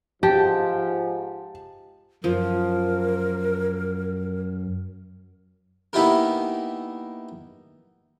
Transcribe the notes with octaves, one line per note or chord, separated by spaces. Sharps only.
G#2 F3 G4 A5
F#2 F3 A#4
A#3 B3 D#4 E4 G4 A#4